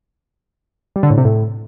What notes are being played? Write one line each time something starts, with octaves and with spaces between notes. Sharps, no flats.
G3
D3
A2
C3
A2